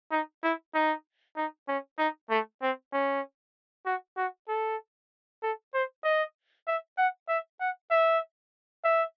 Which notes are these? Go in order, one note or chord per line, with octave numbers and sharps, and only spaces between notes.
D#4
E4
D#4
D#4
C#4
D#4
A3
C4
C#4
F#4
F#4
A4
A4
C5
D#5
E5
F#5
E5
F#5
E5
E5